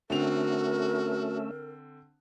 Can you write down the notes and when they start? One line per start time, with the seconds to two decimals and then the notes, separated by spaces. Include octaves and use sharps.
0.10 D3 A3 C4 C#4 F#4 A#4 E5 F7